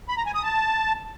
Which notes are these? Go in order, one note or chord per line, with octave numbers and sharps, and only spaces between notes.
B5
A#5
G#5
D#6
A5